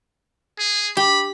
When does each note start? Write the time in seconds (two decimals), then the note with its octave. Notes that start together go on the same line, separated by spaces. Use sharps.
0.59 G#4
0.97 G4 B5